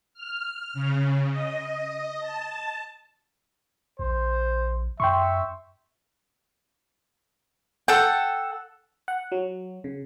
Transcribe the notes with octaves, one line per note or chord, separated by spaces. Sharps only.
F6
C#3
D#5
A5
A#1 C5
F#2 E5 G5 C6 C#6
A4 F#5 G5
F#5
F#3
C#3